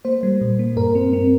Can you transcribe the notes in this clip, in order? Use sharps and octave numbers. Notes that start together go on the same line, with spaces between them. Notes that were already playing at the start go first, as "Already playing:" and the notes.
A#3 C5
G3
A#2
A#3
G2 A#4
C4
C4